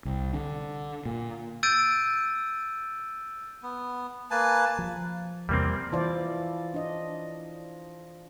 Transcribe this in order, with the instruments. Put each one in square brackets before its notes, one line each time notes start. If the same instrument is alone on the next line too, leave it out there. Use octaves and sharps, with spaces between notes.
[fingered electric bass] C2
D3
A#2
[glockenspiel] E6 G6 A6 D7 D#7
[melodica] B3
A#3 B4 G#5 A5
[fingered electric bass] F3
[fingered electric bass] E2 C3 [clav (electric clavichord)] G3 A#3 C4
[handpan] E3 E4 D5 [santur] F3
[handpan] D4 D#5